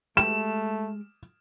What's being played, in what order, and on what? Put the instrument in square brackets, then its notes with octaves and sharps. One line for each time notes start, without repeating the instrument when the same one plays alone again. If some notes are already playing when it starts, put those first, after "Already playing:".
[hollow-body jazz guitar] G#3 G4 G5 [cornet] A3 [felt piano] E7